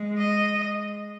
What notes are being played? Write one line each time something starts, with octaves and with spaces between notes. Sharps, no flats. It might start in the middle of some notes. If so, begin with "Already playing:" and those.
Already playing: G#3
D#5